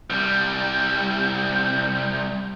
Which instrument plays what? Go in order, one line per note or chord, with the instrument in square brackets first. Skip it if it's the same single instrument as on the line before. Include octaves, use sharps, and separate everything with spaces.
[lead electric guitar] C2 G3 [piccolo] G6